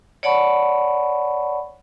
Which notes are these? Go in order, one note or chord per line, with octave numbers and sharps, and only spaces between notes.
C#5 D5 F#5 A5 B5 C#6